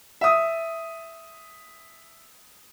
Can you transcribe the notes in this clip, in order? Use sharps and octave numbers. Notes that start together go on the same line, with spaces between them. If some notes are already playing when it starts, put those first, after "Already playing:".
E5 D#6